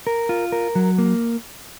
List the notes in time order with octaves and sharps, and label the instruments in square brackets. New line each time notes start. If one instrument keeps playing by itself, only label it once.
[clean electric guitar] A#4
F4
A#4
F#3
A#3